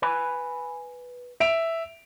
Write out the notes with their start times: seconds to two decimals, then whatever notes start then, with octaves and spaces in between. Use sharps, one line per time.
0.02 B4 G#5 B5
1.40 E5 D7 F7